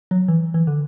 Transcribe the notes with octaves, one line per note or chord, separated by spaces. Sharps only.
F#3
E3
E3
D3